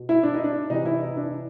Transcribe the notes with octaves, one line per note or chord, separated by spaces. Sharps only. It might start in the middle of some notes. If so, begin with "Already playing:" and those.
Already playing: B2
E4
D4
D#4
D4
C3 E3 D#4
E4
D#4
D4